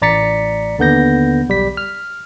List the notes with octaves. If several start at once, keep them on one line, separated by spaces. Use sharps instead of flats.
A1 D5 A#5 A6 B6 C#7
D#2 D3 B3 G6 A#6
B1 G3 B6
F6